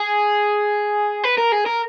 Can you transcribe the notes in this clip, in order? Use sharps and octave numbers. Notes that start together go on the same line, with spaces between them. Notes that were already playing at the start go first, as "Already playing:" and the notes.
Already playing: G#4
B4
A#4
G#4
A#4